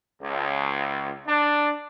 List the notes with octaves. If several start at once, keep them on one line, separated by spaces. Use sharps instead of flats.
C#2
D4